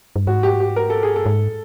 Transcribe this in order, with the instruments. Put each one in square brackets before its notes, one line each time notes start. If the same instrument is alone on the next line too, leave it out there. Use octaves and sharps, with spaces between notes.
[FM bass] G2
[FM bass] G#2 [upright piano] F#4
[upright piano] G4
G4
A#4
A4
G#4
[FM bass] G2 [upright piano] A4
[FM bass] G#2